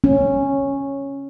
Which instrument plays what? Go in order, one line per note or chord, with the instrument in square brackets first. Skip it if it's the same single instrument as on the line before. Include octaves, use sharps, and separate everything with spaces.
[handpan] C#4